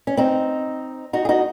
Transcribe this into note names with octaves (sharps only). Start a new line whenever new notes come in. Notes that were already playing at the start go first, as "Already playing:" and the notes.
C#4
C4 D#4
D#4 F#4
G#4
D#4 F#4